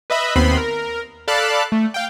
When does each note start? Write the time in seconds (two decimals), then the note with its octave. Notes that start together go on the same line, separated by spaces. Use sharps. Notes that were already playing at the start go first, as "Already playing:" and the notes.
0.10 B4 D#5 E5 B5
0.36 D#2 B3 C4 B5 C6
0.57 A#4
1.28 A4 D5 F5 A5 B5 F#6
1.72 A3
1.94 F5 G5